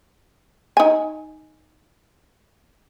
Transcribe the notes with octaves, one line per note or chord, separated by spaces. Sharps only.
D#4 G#5